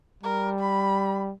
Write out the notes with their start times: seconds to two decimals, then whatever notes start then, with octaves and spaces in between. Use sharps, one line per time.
0.23 G3 A#4
0.60 B5